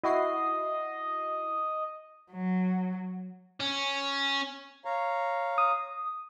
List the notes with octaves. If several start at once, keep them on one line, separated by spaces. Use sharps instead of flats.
E4 F#4 D#5 C7
F#3
C#4
C#5 F5 A#5
D#6